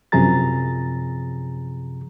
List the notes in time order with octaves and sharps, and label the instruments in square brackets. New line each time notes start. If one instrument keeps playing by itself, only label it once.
[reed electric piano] F#2 C3 F3 G#4 A#5 A6